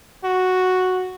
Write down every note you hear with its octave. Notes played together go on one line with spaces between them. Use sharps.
F#4